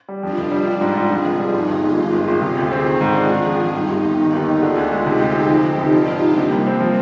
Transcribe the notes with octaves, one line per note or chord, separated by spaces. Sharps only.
G3
F2 D4 F4
F1
G3
G3 D4 F4
G#2
G#2
F2 F4 G#4
F1
G3
G2 D#4 G4
G1
G#3
G2 F4 G#4
G#1
G#1
C3
D2
C4
D#3
G#2
D4
D#3
F2
F2
G2 D#4 G4
G1
G1
D#3
D#2
D#4
D3 F4 G#4
D2
G#3
C3 D#4 G4
D2
C4
F2
F1
F1
F3 D4 F4
G#2
D#4
C3 G3 A#3
C2
C4
F3